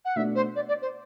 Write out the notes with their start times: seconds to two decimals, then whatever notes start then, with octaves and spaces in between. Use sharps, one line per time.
0.05 F#5
0.16 B2 A3 D4 E5
0.35 C5
0.55 D5
0.68 D5
0.82 C5